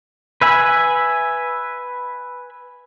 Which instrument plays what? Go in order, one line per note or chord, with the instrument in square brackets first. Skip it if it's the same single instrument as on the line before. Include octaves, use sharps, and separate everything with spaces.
[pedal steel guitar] B4 E5 G#5 B5